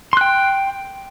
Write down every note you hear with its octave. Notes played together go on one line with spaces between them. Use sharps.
G5 C6 F#6